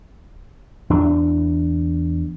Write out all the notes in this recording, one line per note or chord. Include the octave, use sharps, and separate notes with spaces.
E2 D4